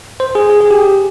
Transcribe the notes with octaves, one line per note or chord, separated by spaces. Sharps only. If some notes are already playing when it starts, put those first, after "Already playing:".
C5
G#4
G#4
G#4
G4